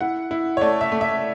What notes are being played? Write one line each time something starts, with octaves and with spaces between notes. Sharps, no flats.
E4 F#5
E4
C#5
A3 D5
E5
A3
E5